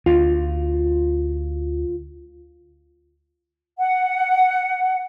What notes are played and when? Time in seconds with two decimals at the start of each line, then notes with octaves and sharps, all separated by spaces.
0.06 D2 F4
3.79 F#5